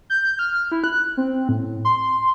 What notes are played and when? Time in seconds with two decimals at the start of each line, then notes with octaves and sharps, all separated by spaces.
0.10 G6
0.39 F6
0.72 E4
0.84 F#6
1.17 C4
1.49 A2
1.85 C6